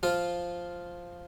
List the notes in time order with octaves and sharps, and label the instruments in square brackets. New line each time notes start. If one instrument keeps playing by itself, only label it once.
[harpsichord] F3 F4